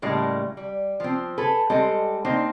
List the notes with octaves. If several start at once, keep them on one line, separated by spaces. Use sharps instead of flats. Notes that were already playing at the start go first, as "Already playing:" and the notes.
A2 C#3 G3 G#3 A#3
G3
F3 C4
G#4 A4 B4
G3 G#3 C4 G4 A4 D#5
A#3 C4 D4 D#4 C5